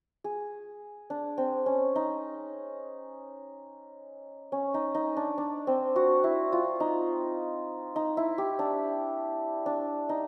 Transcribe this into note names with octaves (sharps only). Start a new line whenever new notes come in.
G#4
D4
C4
C#4
D#4
C#4
D#4
D#4
D4
D4
C4
F#4
E4
F4
D#4
D#4
E4
G4
D4
D4
D#4